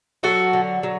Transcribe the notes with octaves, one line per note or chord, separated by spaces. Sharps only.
F#3 F#4 A4
D3
F#3